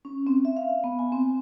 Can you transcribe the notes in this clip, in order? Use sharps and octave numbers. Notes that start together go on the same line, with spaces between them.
C#4
C4
E5
F5
B3
G#5
C4